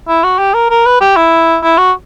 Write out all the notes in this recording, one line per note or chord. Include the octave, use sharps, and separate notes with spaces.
E4
F#4
G4
A#4
A#4
B4
G4
E4
E4
F#4